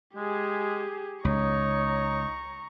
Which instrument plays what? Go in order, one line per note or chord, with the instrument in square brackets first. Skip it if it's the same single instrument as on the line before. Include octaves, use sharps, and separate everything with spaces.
[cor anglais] G#3 [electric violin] G4 G#4
[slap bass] C#2 [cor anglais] D#4 [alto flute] C#5 [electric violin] A#5 C#6